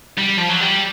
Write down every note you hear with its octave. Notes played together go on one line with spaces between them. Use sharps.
G3
F3
F#3
G3